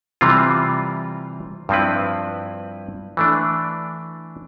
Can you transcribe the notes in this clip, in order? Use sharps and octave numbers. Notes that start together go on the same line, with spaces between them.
C3 E3 G3 C4 F4
G2 F3 C4 E4 B4
E3 A3 D4